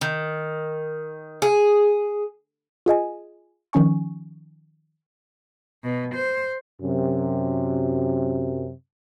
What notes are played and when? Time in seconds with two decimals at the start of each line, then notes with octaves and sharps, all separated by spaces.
0.01 D#3
1.42 G#4
2.86 F4 G#4 D#5 G#5
3.73 D#3 F3 C#4 G#5 C#6
5.84 B2
6.15 C5
6.81 F#2 C3